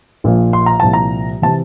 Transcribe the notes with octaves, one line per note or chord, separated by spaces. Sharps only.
A#1 A#2 F3
C6
A#5
C2 A#2 F3 A5
A#5
C3 E3 A5